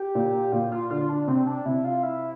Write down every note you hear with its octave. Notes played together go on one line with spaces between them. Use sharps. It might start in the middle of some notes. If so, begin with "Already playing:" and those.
Already playing: G4
A#2
A#2 F4
F4
D3 F4
D4
C3 C4
D4
C3 E4
F4
E4